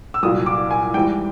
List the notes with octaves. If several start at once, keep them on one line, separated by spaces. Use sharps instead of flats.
E6
C2 A#2 F#3 D#6
D6
G#5
G#2 E3 G3 G5